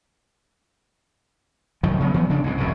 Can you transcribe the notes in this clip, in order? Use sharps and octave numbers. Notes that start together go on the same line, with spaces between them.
C2 F#2 D#3 F3
C#3 F#3 A#3 B3
E3 F#3 B3
C#3 F3 D4
C2 G#2 B2
E1 C2 F2 B2